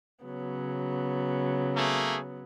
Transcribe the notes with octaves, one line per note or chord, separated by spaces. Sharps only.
C#3 F#3 B3
A3 A#3 G#4